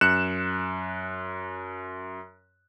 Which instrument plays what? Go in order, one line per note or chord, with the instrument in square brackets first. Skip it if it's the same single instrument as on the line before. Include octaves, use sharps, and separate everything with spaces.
[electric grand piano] F#2 F#6 C#7 E7